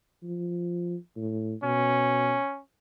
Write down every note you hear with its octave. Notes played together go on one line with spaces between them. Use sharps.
F3
A2
B2 C#4